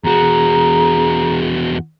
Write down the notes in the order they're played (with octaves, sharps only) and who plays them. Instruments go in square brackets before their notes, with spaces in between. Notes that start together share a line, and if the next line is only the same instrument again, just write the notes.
[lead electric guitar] E2 F#4 [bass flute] G#4 [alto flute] A#5